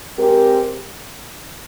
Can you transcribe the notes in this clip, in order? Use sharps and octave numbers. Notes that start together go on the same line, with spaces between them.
G#3 C4 G4 A#4